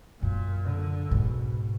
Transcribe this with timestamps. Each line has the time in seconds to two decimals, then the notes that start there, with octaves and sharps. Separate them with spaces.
0.22 F#2 A#2
0.67 D3
1.11 G#2 B2